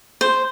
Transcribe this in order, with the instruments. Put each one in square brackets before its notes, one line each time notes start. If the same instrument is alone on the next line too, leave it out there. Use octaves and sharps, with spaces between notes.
[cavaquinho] C5